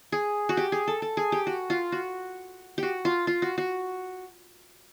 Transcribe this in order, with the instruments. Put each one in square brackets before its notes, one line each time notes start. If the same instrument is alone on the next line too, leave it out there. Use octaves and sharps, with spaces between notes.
[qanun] G#4
F#4
G4
G#4
A4
A4
G#4
G4
F#4
F4
F#4
F#4 G4
F4
F4
F#4
F#4